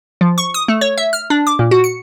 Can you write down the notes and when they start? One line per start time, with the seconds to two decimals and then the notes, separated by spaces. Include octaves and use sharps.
0.21 F3
0.38 C#6
0.54 D#6
0.68 A3
0.81 C#5
0.98 E5
1.13 F6
1.30 D4
1.47 D6
1.59 A#2
1.71 F#4
1.84 C#7